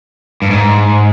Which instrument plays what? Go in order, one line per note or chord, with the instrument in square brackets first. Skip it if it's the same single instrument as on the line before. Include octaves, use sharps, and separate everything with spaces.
[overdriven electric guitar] G2
G#2